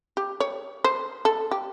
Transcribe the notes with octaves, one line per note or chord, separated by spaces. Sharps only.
G4
C#5
C5
A4
G4